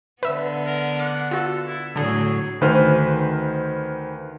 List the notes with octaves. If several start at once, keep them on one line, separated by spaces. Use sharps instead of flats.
D3 B3 B4 E5
A#4
F#5 D6
F4 F#4 A4
E4
A2 D3 F#3 G#4 A4
D2 D#3 B4 C5 F6